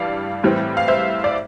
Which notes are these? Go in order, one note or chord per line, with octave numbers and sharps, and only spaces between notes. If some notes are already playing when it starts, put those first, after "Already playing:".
Already playing: G2 E3 G3 D5 F5
A2 E3 G3 C4
F5
C5 E5
D5